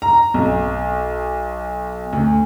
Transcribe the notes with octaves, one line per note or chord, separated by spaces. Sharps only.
A#5
B1
D2